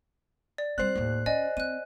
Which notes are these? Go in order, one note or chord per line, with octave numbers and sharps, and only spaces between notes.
D5
G3 C4 C5 F#6
D#2 A2
C#4 D5 D#5 G#5
C4 F#6 D#7